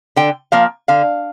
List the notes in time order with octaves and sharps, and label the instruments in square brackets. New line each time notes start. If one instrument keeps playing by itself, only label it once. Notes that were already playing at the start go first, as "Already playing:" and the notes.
[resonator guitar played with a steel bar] D3 G5
F3 A#3 F5
D3 F5